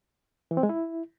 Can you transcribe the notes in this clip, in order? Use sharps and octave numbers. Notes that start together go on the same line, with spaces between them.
E3
C4
G#3
E4